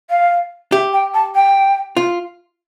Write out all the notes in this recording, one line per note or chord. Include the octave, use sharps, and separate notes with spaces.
F5
G4 E5
G5
A5
G5
F4